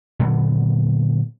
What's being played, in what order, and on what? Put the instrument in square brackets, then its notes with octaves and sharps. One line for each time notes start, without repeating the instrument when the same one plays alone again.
[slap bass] A#2 D3 F#3 B3